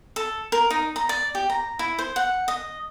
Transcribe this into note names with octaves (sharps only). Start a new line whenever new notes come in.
A4
A#4
D#4
A#5
D5
G4
A#5
E4
C5
F#5
D#5